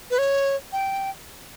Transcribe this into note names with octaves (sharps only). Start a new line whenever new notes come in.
B4
C#5
G5